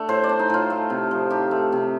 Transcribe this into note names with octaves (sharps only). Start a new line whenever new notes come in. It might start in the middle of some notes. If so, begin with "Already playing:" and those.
Already playing: A3 D4
A2 C5
D5
D4
D#4
A2 F4
A3
C3
F3
D#4 G4
A3
C3